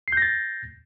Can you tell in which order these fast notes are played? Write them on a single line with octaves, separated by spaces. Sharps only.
C7 G6 A#6 A6